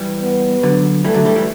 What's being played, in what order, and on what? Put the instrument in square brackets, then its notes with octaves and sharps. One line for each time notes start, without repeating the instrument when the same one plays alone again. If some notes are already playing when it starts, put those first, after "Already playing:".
Already playing: [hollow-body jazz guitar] E3 G3
[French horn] B3
[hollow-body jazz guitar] D3 F#3
[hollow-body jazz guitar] E3 G3 [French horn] A3
[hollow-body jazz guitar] D3 F#3
E3 G3
E3 G3